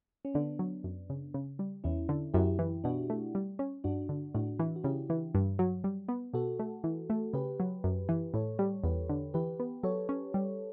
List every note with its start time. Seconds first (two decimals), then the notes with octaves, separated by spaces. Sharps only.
0.25 C#4
0.34 D3 B3 D4
0.59 F#3
0.84 F#2
1.10 C#3
1.34 C#3
1.59 G3
1.84 E2 C#4 E4
2.09 D3
2.34 F#2 E4 G4
2.59 E3
2.84 B2 D4 F#4
3.10 A3
3.35 G3
3.59 C#4
3.84 G2 D4 F#4
4.09 D3
4.34 A2 D4 F#4
4.59 E3
4.76 F#4
4.84 C#3 E4 G4
5.10 E3
5.35 G2
5.59 F#3
5.84 G3
6.08 B3
6.33 B2 F#4 A4
6.59 A3
6.84 E3
7.10 A3
7.33 C#3 G4 B4
7.60 F#3
7.84 F#2
8.09 E3
8.34 A2 A4 C#5
8.59 G3
8.84 E2 G4 B4
9.09 D3
9.34 E3 G4 B4
9.60 B3
9.83 F#3 A4 C#5
10.09 C#4
10.34 G3